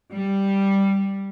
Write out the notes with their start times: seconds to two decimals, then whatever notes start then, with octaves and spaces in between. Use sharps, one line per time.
0.12 G3